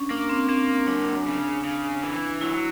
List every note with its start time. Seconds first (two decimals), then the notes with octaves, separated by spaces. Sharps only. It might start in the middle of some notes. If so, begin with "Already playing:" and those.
Already playing: C#4 D4
0.10 A#3 D4
0.29 C4
0.49 A#3 C4
0.68 C#4
0.87 F#2 D4
1.26 C#3
1.64 C#3
2.03 E3
2.41 F#3 E4